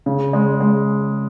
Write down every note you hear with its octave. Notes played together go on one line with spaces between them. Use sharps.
C#3
G#3
G#3